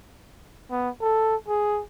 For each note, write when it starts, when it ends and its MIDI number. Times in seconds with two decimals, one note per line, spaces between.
0.71 0.90 59
1.01 1.36 69
1.48 1.82 68